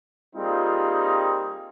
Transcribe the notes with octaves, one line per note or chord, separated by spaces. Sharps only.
G3 A#3 C4 D#4 F4 G#4